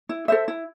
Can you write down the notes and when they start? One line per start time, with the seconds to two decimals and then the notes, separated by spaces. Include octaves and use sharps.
0.09 E4
0.28 A4 C5 E5
0.48 E4